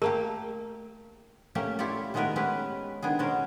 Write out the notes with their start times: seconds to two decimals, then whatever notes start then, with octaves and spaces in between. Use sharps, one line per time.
0.02 A3 A#3 G4 A#4
1.55 A3 A#3 C#4 G4
1.79 E4 F4 G4 C#5 D5
2.14 D#3 G#3 A3 B3 A#4 B4
2.36 G#3 C#4 G4 B4
3.02 D#3 B3 D4 G#4
3.19 B2 G#3 C#4 A#4